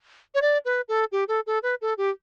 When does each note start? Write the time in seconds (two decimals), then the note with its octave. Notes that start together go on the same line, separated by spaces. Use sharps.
0.35 C#5
0.42 D5
0.65 B4
0.88 A4
1.12 G4
1.28 A4
1.47 A4
1.63 B4
1.81 A4
1.98 G4